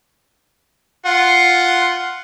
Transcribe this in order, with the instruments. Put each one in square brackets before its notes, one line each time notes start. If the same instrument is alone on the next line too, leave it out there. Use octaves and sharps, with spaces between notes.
[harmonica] F4 F#5